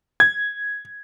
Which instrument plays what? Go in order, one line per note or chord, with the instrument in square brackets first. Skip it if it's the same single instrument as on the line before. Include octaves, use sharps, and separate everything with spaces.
[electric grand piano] G#6